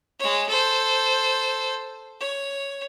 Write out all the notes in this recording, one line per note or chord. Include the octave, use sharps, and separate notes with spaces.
G#3 C#5
A4 C5
C#5